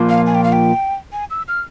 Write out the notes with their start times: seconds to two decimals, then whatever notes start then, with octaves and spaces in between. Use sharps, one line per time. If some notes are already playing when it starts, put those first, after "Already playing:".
Already playing: A#2 F3 A#3 F4
0.09 F5
0.26 G#5
0.35 G5
0.44 F5
0.52 G5
1.13 G#5
1.30 E6
1.48 F6